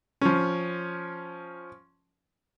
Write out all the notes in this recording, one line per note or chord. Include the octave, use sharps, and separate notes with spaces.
F3 C#4